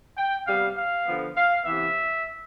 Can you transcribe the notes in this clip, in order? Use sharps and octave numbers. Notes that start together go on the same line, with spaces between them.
G5
C3 G3 B3 F5
F5
D3 F3 B3
F5
C3 E3 B3 E5